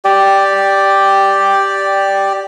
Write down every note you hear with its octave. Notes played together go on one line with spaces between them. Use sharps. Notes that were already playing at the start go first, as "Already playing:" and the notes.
G4 D5